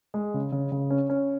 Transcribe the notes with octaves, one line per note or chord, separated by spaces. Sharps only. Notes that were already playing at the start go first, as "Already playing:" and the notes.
G#3
C#3
C#3
C#3
C#4
C#4